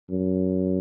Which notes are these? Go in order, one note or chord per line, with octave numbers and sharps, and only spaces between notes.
F#2